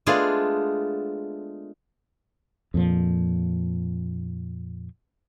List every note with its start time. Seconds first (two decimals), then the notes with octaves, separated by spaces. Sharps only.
0.06 G#3 A3 B3 D4 F4 G#4
2.74 F2 A#2 F3